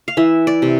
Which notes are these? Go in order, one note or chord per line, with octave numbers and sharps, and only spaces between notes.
F5
E3 E5
D5
C3